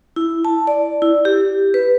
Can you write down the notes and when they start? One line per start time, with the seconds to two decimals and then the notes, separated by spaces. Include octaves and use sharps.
0.16 E4
0.45 A5
0.67 D5
1.02 E4
1.25 G4
1.74 B4